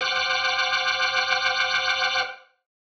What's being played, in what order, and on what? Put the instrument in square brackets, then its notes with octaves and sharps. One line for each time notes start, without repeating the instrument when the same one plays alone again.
[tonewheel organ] C5 F#5 G5 D6 F6 F#6